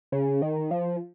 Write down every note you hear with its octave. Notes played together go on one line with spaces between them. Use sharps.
C#3
D#3
F3